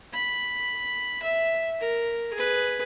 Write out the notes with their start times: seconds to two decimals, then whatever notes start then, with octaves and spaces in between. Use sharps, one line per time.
0.14 B5
1.22 E5
1.80 A#4
2.33 G#4 B4